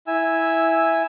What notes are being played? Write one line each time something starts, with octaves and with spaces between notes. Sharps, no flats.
E4 G#5 E6